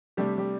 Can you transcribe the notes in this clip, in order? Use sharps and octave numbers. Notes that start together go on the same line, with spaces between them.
C3 G3 A3 D4 G4
G3 G4